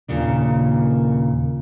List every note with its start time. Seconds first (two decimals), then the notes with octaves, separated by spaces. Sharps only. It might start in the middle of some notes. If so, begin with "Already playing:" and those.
0.08 D#2 A#2 C#3 D4